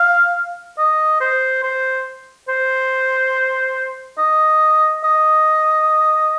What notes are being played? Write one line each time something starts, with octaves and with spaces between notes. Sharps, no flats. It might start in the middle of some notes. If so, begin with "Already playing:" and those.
Already playing: F5
D#5
C5
C5
C5
D#5
D#5